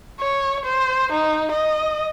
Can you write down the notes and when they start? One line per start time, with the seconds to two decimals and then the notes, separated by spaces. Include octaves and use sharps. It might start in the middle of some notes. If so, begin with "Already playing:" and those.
0.20 C#5
0.65 C5
1.12 D#4
1.51 D#5